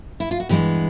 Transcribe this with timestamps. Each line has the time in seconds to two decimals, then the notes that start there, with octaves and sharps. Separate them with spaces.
0.20 E4
0.31 F4
0.40 F#4
0.49 G2 E3 G#3 B3 G4